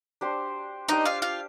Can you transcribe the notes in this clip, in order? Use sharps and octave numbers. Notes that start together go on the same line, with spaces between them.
D4 G4 C5
D4 D#4 G4 C5 D#5
F4 F5
F4 F5